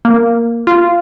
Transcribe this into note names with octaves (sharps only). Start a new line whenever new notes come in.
A#3
F4